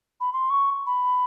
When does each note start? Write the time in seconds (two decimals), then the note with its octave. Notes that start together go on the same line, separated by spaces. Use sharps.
0.20 B5
0.33 C6
0.50 C#6
0.86 B5